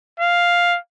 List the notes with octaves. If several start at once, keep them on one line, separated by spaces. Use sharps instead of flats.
F5